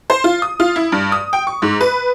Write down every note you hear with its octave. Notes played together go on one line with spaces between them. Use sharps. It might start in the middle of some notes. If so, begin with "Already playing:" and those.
C5
F4
D#6
F4
E4
G2
D#6
G5
C#6
G#2
B4